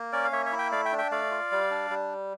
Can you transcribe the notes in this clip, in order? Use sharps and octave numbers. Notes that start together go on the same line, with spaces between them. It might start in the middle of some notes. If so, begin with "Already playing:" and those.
Already playing: A#3
C#4 A#4 D5
F5
A#3 C#5 E5
C#5 E5
E4
E5 G5
A3 D5 F5
E5 G5
D4
E5 G5
A3 D5 F5
F4
G3
D4
G3